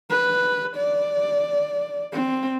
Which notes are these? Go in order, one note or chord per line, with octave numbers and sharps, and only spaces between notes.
B4
D5
C4